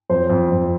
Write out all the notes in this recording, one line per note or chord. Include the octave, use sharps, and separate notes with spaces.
F2 C5
F2
F2